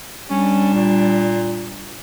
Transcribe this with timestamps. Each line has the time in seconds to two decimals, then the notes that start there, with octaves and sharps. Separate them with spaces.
0.30 G3 C#4 D4
0.74 A#2